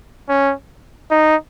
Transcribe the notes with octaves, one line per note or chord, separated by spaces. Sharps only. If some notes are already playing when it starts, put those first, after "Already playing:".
C#4
D#4